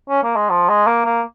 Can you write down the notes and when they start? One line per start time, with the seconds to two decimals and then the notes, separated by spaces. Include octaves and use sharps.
0.09 C#4
0.23 A#3
0.36 G#3
0.50 F3
0.69 G#3
0.87 A#3
1.05 A#3